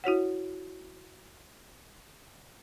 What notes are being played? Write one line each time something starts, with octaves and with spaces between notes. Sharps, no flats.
E4 F#4 C#5 F#5